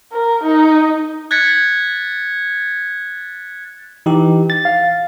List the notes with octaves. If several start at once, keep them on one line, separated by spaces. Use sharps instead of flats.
A#4
D#4
F#6 G#6 A6 B6 C#7
E3 D#4 G4
A6
F5